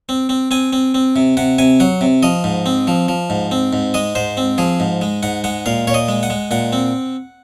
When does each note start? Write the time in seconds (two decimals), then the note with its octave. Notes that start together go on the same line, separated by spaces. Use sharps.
0.09 C4
0.29 C4
0.51 C4 G#5
0.73 C4
0.94 C4
1.16 C3
1.37 C3 F#5
1.58 C3 G#5
1.80 F#3 F#5
2.01 C3
2.23 F3 D#5
2.44 G#2
2.66 C4
2.87 F3
3.08 F3
3.30 G#2
3.51 C4
3.73 G#2
3.94 G#3 D#5
4.15 G#2 C5
4.37 C4
4.58 F3 G#4
4.80 G#2
5.01 G#3
5.23 G#2 F#5
5.44 G#3 F#5
5.66 A#2 F5
5.87 A#2 C#5
5.94 D#5
6.08 G#3
6.23 F#5
6.30 G#3
6.51 A#2 F#5
6.73 C4